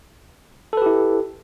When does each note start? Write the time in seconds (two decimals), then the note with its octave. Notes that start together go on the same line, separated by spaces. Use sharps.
0.73 A4
0.77 B4
0.82 G4
0.86 E4